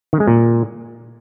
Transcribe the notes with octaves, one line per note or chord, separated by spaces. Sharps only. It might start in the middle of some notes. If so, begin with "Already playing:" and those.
D#3
G#3
A#2